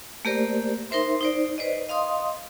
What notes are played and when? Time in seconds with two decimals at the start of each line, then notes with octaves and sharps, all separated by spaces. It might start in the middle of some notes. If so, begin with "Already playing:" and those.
0.25 A3 A#3 G4 A#4 C5 D5
0.90 D#4 A#4 C5 E5 C6
1.21 D#4 C5 D5
1.58 B4 C5 D5 D#5
1.89 D#5 F5 C6 D#6